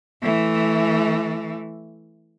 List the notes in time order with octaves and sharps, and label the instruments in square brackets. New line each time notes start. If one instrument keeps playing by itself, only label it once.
[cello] E3 A3